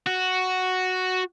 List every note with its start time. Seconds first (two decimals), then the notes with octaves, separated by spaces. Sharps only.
0.07 F#4